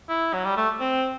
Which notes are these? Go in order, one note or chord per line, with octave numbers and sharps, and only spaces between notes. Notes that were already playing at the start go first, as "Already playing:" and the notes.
E4
F#3
G3
A3
C4